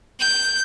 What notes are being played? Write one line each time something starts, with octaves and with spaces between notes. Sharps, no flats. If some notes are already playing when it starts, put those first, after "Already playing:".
G6